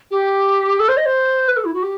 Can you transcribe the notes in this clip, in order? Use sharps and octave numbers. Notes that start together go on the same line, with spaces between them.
G4
A4
C5
D#5
C5
B4
A4
E4
F#4
G4